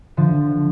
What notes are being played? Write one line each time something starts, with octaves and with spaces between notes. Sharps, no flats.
D3 F3